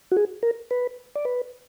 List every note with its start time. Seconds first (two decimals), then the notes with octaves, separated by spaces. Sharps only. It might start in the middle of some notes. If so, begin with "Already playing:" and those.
0.11 F#4
0.17 G#4
0.43 A#4
0.71 B4
1.16 D5
1.25 B4